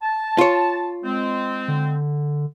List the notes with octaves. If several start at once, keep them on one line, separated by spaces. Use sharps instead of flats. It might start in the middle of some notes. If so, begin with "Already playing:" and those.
A5
F4 C#5
G#3 C4
D3